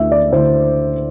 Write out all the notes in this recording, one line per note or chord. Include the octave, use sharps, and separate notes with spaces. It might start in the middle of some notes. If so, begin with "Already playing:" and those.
Already playing: D2 D3 A3 E4 E5
D5
D2 D3 A3 E4 C5